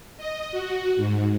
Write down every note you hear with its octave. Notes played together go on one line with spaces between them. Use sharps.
D#5
F#4
G#2